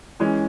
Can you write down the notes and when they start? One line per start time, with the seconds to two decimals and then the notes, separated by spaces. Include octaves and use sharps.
0.20 E3 G#3 C#4